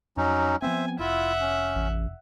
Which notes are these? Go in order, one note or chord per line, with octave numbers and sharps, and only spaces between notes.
F2 F#3 C#4 D#4
F3 B3 C4 C5 E5 G#5
F1 E4 F4 E5 F#5
C#4
A1